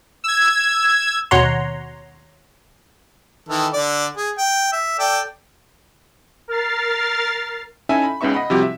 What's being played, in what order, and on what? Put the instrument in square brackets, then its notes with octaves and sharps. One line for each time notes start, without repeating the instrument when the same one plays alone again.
[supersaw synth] E6 G#6
[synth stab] D#2 B2 C#5 F#5 A#5 C6
[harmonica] D#3 E3 A4
D3 D5
G#4
G5
E5
A4 D5 G5
[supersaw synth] A#4 F6 A6 C7
[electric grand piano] C#4 D#4 E4 A4 E5 G#5
B5
C#2 C#3 B3 D#4 E5 C#6
D#5 F#5 B5
C3 F3 G3 E4 F#4 G4
E5